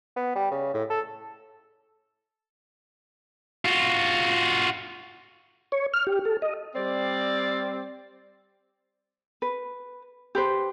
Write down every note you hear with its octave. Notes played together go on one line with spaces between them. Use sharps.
B3
G3
C#3
A2
A4
F4 F#4
C#5
F6
G4
A4
D#5
G3 C4 C5 D5
B4
G4 B4 C5